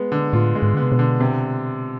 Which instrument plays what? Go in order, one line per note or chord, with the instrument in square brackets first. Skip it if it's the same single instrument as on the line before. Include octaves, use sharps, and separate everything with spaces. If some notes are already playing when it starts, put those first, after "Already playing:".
Already playing: [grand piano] G#3 B3
D3
[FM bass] A2 [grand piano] F4
[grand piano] G#3
[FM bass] G#2
[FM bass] D3 [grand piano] B3
[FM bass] C3
B2
[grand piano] D3
C3